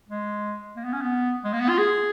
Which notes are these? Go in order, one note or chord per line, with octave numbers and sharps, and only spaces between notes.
G#3
A#3
B3
C#4
B3
G#3
A#3
B3
F4
G#4